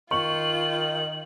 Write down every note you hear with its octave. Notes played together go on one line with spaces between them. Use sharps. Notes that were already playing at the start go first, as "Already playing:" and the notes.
D#3 F4 C#6 F#7